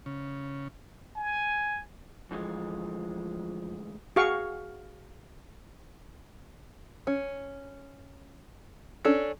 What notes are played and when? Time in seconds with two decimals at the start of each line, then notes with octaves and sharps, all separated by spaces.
0.06 C#3
1.16 G#5
2.31 D2 E3 F3 G#3
4.16 F#4 G#4 F5 C#6
7.07 C#4
9.05 C#4 D4 A4